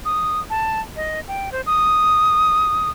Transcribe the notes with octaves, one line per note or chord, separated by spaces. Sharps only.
D#6
A5
D#5
G5
C5
D#6